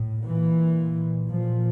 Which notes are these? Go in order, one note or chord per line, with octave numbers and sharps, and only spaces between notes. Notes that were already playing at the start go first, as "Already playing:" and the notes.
Already playing: A2
A#2 E3
A#2 F3